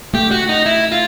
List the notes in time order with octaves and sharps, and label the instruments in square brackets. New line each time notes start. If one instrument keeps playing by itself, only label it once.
[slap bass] A3 [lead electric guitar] G4
[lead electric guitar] F#4
D#4
E4
F4